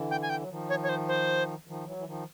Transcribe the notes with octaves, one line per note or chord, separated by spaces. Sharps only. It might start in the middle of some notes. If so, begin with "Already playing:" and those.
Already playing: D3 E3
G5
G#5
G5
F#3
D#3 F3
C#5
C#5
C5
C5
D#3 F3
E3 F#3
E3
D#3 F3